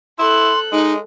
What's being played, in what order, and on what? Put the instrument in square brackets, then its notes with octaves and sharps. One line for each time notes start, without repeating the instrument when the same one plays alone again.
[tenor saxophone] E4 [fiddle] A4 F#6 [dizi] C6
[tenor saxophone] G#3 [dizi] D#4